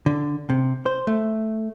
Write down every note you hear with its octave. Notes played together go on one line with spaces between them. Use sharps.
D3
C3
C5
A3